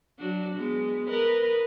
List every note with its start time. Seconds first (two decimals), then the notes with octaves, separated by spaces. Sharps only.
0.19 F#3 D4 F#4
0.55 G#3 B3
1.08 A#4 B4 D#5